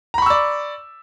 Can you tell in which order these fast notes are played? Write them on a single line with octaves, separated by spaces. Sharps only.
A#5 B5 C#6 E6 D5